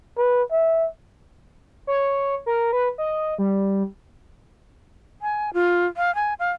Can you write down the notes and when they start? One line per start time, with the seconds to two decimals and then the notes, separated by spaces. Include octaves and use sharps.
0.18 B4
0.51 E5
1.87 C#5
2.46 A#4
2.73 B4
2.98 D#5
3.38 G3
5.22 G#5
5.53 F4
5.97 F5
6.15 G#5
6.39 F5